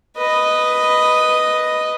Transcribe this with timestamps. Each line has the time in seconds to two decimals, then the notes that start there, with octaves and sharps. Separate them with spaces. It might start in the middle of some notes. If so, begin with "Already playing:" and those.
0.17 B4 D#5